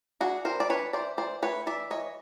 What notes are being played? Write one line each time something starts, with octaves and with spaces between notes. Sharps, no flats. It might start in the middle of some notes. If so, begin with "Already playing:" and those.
D4 F#4 G#4
E3 A#4 C5
D5
D4 B4 C#5
E3 C5 D5
E3 C5 D5
A3 B4 C#5
E3 D5 E5
E3 C#5 D#5